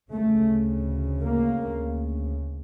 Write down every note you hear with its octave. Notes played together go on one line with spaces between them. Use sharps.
D2 C#3 A3
A#3